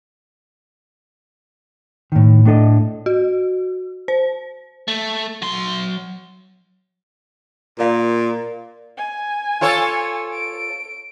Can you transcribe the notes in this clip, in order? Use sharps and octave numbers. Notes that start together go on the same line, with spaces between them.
A2 D#3
A2 D4 A4 D#5
F#4
C5
A3
F#3 C6
A#2 A#4 D5 F5
G#5
F4 A4 C#5
D7